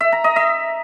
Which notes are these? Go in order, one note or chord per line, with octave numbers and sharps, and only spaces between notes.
E5
A#5
D#5
E5